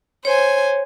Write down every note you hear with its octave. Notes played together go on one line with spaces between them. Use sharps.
C5 C#5 G#5